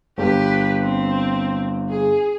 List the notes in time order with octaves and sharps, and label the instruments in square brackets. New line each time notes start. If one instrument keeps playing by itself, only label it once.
[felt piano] G1 [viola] G4 B4
[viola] C4
G#4